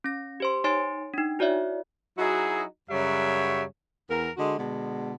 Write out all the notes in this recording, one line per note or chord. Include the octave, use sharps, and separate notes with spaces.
C#4 A#6
G4 C5 C6
D#4 C#5 G#5 C6 A6 D7
D4 D#4
E4 F#4 C#5 D5 E5
F#3 D#4 E4 F#4 G#4 D#5
F#2 C#3 F#3 G3 C#5 E5
E2 A#4
D3 G#3 F#4
B2 D3 G#3